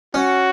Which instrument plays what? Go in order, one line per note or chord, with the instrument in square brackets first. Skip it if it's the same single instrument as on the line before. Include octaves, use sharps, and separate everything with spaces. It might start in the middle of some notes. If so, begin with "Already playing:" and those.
[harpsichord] C#4 [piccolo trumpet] F#4